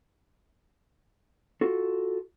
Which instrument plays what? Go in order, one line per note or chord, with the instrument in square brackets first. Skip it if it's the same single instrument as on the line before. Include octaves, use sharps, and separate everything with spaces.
[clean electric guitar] F4 F#4 A4